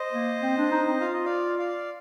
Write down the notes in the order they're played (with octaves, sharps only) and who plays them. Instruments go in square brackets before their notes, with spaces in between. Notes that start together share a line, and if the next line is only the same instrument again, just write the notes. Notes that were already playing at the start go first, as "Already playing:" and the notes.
Already playing: [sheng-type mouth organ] C5 D#5
[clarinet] A#3
C4
D4
D#4
C4
[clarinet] F4 [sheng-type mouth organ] F5
[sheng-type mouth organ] D#5
D5 F5
D5 F5